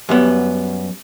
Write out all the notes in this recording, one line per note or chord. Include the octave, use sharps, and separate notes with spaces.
F#2 G3 B3